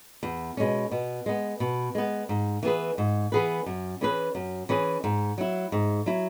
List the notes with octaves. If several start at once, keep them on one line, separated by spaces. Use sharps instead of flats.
E2
B2 G#3 C#4
B2
G#3 B3
B2
G#3 B3
G#2
E3 B3 G#4 B4
G#2
E3 B3 G#4 B4
F#2
E3 C#4 G#4 B4
F#2
E3 C#4 G#4 B4
G#2
F#3 E4
G#2
F#3 E4